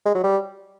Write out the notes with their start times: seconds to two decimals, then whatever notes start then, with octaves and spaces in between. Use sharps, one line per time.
0.06 G#3
0.15 F#3
0.24 G3